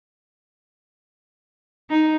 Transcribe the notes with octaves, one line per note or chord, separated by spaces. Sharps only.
D#4